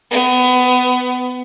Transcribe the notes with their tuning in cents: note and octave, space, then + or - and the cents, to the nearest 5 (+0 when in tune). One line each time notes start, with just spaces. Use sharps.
B3 +25